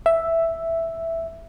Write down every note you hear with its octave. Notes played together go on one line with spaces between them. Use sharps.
E5